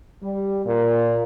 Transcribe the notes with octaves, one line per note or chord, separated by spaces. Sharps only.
G3
A#2